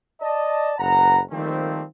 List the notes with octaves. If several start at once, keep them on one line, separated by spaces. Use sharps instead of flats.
D5 D#5 A5
F#1 B4 F#5 A#5
D#3 F3 G3 A3 A#3 C4